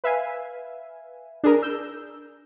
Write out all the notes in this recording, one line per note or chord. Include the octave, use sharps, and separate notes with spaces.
B4 E5 F5 G#5
D4 G#4 A#4
E6 G6